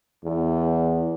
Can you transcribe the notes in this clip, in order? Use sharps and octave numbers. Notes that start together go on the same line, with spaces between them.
E2